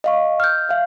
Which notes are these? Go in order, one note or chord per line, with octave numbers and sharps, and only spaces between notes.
D#5 F5 C#6
F6 G6
E5 F5